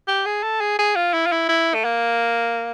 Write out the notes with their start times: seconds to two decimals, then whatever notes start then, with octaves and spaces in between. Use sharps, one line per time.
0.08 G4
0.26 G#4
0.43 A4
0.61 G#4
0.79 G#4
0.96 F4
1.14 E4
1.27 F4
1.32 E4
1.49 E4
1.74 A3
1.84 A#3